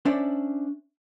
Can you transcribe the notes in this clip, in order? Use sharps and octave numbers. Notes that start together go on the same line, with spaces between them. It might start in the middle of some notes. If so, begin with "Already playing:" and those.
C#4 D4 C5 D5 E5